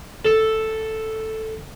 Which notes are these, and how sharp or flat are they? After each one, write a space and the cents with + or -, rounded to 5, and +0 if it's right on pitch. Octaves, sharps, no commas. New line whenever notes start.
A4 +0